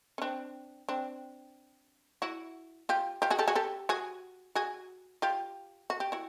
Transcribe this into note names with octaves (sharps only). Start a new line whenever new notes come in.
C#4
C4 D4
C4 D4
E4 F#4
F4 G4
F4 G4
F#4 G#4
G4 A4
F#4 G#4
G4 A4
F#4 G#4
F#4 G#4
F4 G4
F#4
G4
E4 F#4